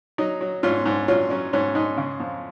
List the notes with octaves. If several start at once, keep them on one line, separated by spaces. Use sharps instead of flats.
F#3 D#4
F#3
G#2 C#4 F4
G#2
F#3 C#4 F4
F#3 C#4
G#2 C#4
G#2 D#4
C#3
F2